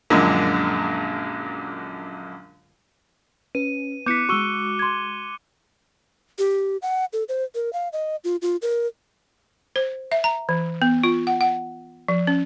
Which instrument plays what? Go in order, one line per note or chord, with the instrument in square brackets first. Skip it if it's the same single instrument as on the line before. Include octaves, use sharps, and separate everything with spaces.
[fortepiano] A#1 F#2 A#2 D3 G#3
[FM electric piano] C#4 [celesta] B4 [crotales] D#7
[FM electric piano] B3 E4 [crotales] D6 F#6 C#7 [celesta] G6 B6
[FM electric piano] G#3 F#4 [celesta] C#6 E6 [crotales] C#7 D#7 G7
[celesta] C6 G#6
[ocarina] G4
F#5
A4
C5
A#4
F5
D#5
F4
F4
A#4
[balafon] C5
E5
A#5
E3
B3
F4
F#5
F#5
F3
C#4